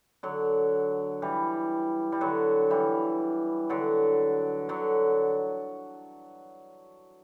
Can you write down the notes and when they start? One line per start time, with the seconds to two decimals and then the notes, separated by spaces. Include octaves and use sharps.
0.23 D3 F#3
1.22 E3 G3
2.12 G3
2.21 D3 F#3
2.70 E3 G3
3.70 D3 F#3
4.69 D3 F#3